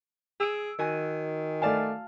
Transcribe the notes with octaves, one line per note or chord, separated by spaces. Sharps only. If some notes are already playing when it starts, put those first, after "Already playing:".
G#4 E6 D7
D#3 F#4 G#5
A3 D5 F5 G#5 A5 F6